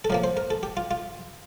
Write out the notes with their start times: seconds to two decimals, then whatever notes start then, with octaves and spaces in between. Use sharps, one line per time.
0.05 A4
0.10 A2 F3 A#3 A#4
0.24 C5
0.37 A#4
0.50 A4
0.63 G4
0.77 F4
0.91 F4